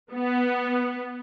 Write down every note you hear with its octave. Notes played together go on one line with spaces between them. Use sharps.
B3